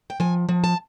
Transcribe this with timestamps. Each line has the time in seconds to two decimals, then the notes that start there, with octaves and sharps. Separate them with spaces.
0.10 G5
0.20 F3 G#5
0.49 F3
0.64 A5